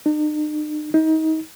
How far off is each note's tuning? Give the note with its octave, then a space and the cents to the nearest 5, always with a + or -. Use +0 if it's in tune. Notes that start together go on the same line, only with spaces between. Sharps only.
D#4 -45
D#4 +30